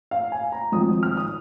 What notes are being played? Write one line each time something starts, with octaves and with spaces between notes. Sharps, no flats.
F5
G#5
A#5
G#1 G#2 F3 C4 D#6
F6
D#6